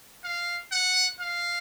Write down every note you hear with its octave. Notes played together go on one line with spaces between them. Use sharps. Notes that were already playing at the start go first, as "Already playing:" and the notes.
F5
F#5
F5